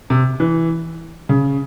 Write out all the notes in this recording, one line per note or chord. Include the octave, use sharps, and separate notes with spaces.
C3
E3
C#3